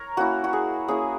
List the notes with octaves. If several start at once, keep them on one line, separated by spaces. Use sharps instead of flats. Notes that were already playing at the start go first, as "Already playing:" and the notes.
Already playing: A#4 C#5
A#3 C#4 E4 F#4
F#4
G#4
A#3 C#4 E4 G#4